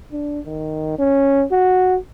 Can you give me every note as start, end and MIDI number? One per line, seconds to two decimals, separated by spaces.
0.12 0.40 62
0.46 0.96 51
0.99 1.44 61
1.52 1.97 66